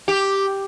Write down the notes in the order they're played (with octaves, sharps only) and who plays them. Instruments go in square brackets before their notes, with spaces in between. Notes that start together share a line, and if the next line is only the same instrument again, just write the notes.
[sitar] G4